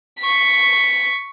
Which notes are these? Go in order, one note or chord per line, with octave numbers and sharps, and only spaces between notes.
C#6 B6